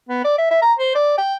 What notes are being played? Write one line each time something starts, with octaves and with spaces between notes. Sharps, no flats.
B3
D5
E5
E5
A#5
C5
D5
G5